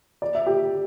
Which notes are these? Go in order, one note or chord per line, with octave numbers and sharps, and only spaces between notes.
D5
E5
G4